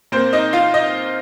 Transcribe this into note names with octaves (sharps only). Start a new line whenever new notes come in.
A#2 A#3 C4 C5
D#4 D#5
F4 F5
D#4 D#5